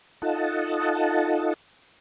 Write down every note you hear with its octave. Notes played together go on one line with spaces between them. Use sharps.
D#4 F4 A4 D#5 F#5 A5